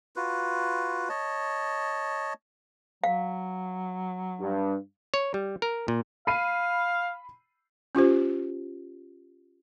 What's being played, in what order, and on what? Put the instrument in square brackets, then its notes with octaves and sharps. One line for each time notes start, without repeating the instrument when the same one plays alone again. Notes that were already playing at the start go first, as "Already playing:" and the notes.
[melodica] F4 F#4 B4
C#5 D#5 A5
[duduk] F#3 [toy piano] F5
[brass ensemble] G2
[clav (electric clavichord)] C#5
G3
A#4
A#2
[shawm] F5 [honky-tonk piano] B5 C7 D#7
[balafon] C#4 F4 G4 C5